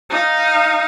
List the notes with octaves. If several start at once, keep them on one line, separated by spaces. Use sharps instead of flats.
D#4 F5